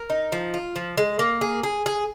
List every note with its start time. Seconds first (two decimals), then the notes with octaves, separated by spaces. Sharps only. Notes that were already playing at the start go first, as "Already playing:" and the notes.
Already playing: A#4
0.10 D#4
0.32 F3
0.54 F4
0.76 F3
0.97 G#3
1.19 A#3
1.41 G#4
1.63 G#4
1.86 G#4